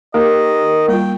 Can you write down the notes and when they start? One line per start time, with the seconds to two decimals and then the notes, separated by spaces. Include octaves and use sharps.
0.14 D#3 A#3 G4 A#4 D#5
0.89 G3 A#3 F4 G5